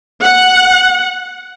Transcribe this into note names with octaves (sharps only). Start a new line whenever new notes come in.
F#5